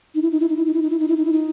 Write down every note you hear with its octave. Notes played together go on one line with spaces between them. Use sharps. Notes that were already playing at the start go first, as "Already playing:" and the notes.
D#4
E4
D#4
E4
D#4
E4
D#4
E4
D#4
E4
D#4
E4
D#4
E4
D#4